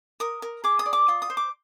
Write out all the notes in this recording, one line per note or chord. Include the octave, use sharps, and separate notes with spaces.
A#4 D#6
A#4
G#4 D6
D#6
D5
D6
F4 D#6
D#6
C5
D6